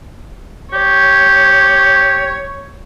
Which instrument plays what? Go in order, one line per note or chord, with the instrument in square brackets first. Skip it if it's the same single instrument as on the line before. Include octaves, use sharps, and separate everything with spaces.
[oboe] G4 [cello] C#5